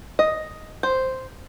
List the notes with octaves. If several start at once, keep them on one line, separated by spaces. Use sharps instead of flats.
D#5
C5